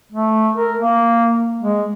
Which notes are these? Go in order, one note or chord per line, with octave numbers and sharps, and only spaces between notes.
A3
A#4
A#3
G#3